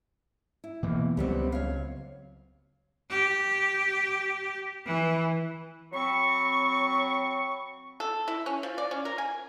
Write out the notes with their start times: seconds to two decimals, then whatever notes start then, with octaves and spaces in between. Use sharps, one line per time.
0.64 E4
0.83 B2 E3 A#3
1.17 C#2 F#3 G3 B3 C4
1.52 C#5 F5
3.10 G4
4.86 E3
5.93 F#3 C4 B5 C#6
8.00 A4
8.28 E4
8.46 C#4
8.63 F3
8.78 D5
8.91 C#4
9.05 A#4
9.18 G#5